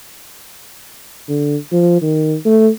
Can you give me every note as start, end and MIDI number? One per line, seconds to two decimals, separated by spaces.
1.29 1.56 50
1.72 2.00 53
2.02 2.36 51
2.45 2.69 57